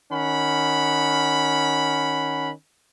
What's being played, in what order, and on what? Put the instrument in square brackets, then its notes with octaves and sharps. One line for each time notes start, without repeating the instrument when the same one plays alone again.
[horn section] D#3 C#4 F#5 B5